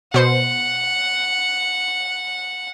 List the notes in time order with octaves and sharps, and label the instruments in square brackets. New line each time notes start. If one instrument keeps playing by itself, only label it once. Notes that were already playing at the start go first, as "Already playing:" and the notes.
[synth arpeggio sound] B2 C5 C7 [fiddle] F#5